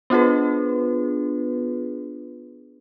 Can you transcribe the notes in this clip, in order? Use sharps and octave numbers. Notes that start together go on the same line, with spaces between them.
B3 D4 F4 G#4 B4